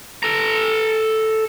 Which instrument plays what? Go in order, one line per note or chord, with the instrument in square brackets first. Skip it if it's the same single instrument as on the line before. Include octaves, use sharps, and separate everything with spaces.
[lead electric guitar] A4 A#5